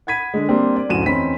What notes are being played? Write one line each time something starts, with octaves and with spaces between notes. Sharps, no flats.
F#5 B5 G#6 B6 D#7
D3 G#3
G3 A#3 C4 D4
D5
D1 F#2 F#4 D#7 E7
E2 C4 C#4 D#4 B5 B6